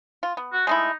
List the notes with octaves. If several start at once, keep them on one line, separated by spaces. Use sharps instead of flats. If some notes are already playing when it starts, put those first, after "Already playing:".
F4
B3
F#4
G#3 A3 D#4 E4